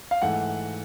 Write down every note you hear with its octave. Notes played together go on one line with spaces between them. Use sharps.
F5
G#2 E3 A3 F#5